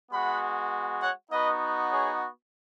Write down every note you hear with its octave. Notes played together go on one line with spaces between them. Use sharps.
G#3 B3 F#4 F#5 B5
C#5 F#5
B3 D#4 F#4 B4 D#5
G#4 C#5